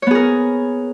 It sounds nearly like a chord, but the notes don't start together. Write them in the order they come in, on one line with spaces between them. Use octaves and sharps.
C#5 B3 G#4 A#4